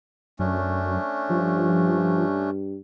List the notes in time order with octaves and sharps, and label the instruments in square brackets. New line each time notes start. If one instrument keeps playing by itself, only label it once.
[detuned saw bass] F#2 [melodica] A3 C#4 D4
[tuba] G2 [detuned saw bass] F3